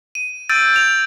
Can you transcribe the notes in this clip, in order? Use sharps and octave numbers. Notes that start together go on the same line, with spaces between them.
D#7
E6 G6 A6 D7 D#7
F7